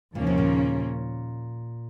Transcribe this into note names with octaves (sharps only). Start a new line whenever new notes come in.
D#2 A#2 C#3 F3 A#3 C#4
C3
A#2